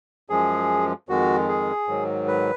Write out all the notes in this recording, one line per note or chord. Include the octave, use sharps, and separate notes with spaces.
F#2 F3 G#3 G#4
F2 D#3 G#3 F#4
G#4
G#2 D#3 F#3
B4